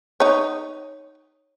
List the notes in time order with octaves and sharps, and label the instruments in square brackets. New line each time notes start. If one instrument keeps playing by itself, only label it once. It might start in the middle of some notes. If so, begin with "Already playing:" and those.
[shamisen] D#4 C#5